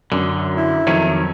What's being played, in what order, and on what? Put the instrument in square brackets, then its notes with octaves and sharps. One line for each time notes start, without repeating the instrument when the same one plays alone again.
[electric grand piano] F#2 [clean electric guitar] D3
[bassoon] E4
[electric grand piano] F2 [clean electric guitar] D#3 F#3 C#4